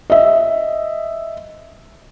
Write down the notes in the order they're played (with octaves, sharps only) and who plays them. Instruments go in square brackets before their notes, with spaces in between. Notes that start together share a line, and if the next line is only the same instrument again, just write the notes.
[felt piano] D#5 E5